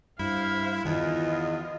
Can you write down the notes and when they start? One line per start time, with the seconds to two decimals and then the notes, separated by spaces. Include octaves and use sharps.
0.19 G2 E4 C5 F5
0.85 E2 D#3 E3 F4 D#5